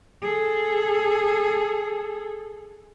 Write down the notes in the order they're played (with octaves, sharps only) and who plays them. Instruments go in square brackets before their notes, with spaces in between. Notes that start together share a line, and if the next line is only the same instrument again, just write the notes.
[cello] G#4 A4